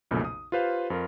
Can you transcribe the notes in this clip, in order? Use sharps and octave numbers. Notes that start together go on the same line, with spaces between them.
B1 F2 A#2 C#3 A3
D#6
F4 G4 B4 C5 F5
F2 F4 A#4